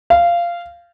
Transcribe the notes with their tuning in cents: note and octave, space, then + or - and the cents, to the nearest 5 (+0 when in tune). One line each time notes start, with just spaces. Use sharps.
F5 -15